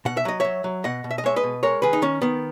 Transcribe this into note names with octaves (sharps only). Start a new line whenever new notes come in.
B2 F#5
E5
F#3 D#5
F#3 C#5 E5
F#3
B2 D#5 F#5
B2
E5
D#5
G#3 C#5 E5
B4 D#5
B2
G#3 A#4 C#5
D#3 G#4 B4
D#4
D#3 C#4
D#3 B3